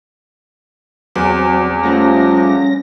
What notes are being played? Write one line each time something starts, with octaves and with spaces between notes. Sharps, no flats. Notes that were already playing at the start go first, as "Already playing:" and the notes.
E2 F#3 C4
F3 G3 A3 C#4 A#6